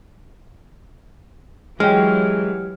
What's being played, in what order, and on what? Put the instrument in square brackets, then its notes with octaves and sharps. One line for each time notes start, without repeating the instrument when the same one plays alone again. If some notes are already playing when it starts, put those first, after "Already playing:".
[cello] E3 F#3 [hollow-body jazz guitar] G#3 [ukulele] C#4 G4 [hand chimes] F6